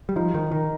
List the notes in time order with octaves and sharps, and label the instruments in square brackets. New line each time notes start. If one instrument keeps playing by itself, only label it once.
[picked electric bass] G3
[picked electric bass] F3 [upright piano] D#4
[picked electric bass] D#3 [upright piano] D#4
[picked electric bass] D#3 [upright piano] A#4